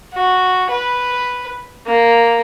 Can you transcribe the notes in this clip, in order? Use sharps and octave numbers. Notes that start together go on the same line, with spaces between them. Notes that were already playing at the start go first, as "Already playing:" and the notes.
F#4
B4
A#3